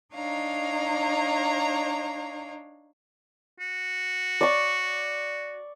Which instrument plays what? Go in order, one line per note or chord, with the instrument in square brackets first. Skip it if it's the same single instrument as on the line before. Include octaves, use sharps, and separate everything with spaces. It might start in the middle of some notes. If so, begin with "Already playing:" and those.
[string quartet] D4 D#4 C#5 F5 A#5
[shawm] F#4
[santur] D5 C#6